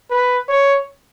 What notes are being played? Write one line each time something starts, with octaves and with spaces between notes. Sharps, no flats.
B4
C#5